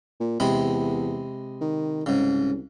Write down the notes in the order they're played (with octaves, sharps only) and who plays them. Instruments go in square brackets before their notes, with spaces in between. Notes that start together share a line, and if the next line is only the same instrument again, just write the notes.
[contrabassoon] A#2
[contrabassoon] E2 [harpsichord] C3 G#3 B5
[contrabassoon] D#3
[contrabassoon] C2 [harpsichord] G#2 C#3